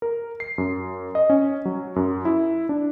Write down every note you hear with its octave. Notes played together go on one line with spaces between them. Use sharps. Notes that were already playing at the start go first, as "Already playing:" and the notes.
A#4
C7
F#2
D#5
C#4
F#3
F#2
E4
D4